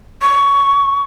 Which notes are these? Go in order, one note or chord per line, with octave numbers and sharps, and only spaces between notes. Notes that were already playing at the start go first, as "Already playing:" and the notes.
C#6